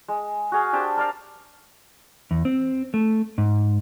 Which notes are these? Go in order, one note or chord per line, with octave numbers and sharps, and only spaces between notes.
G#3
F#4 G#4 F5
D4 G4 C5 A5
A#4 D5 F5
E2
C4
A3
G#2